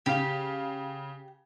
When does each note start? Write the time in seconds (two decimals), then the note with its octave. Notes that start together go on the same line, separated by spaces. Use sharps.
0.06 C#3 G4 F5